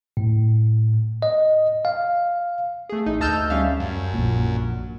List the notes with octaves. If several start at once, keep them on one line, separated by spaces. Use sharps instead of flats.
A2
D#5
F5
A3 G#4
A1 D#4
D2 D#5 A5 E6 F6 G6
G3 C#4 E5 F5
F#2
A#1 A#2